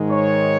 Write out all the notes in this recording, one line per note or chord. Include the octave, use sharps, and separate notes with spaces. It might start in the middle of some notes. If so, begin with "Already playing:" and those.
Already playing: G#2 D#3 G#3
C#5